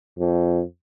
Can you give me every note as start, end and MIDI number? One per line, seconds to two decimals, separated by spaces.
0.18 0.61 41